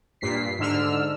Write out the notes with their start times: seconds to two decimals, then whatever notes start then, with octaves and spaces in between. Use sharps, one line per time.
0.21 G2 A#2 B6 C7
0.59 G#2 D3 E6 F6